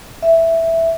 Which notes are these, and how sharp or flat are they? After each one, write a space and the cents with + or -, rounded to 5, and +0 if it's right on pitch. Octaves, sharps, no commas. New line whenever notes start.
E5 +0